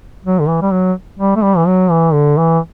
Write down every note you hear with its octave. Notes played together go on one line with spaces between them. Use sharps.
F#3
D3
E3
G3
F#3
G3
A3
G3
E3
F#3
E3
D3
E3